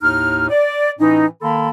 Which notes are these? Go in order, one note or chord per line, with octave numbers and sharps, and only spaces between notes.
D#2 A2 D#4 F6
D5
A2 E3 C#4 D#4
D#3 A#3 A4 A5 B5 C6